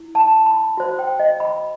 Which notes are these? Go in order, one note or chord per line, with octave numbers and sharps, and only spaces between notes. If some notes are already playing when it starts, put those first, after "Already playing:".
Already playing: E4
A5
B5
F#4 C5
G5
D#5
B5